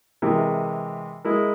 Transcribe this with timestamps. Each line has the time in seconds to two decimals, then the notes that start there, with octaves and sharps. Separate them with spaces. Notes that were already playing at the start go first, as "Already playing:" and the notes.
0.22 C3 E3 G#3 E4 A#4
1.25 G#3 E4 A#4